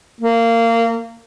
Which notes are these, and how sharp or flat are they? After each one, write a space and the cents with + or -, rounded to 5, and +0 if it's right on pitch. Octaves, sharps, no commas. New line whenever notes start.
A#3 -20